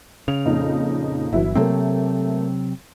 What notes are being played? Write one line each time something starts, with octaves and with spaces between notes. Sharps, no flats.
C#3 F7
F2 A#2 D#4
G1 E3 F#3 E4
C3 F#3 A3 A#3 C4